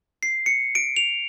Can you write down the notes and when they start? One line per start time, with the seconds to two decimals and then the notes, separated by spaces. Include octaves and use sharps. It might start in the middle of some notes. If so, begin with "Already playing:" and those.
0.23 C7
0.46 C#7
0.75 D7
0.97 F7